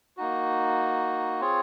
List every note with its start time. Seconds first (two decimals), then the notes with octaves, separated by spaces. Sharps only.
0.17 A#3 D#4 F#4
1.41 C4 F4 G#4 C#5